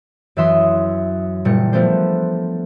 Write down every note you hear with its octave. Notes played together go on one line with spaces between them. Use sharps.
F#2 E3 E5 C6 D#6
F#1 A#2 G3 C#7
F3 A3 B3 D4 C5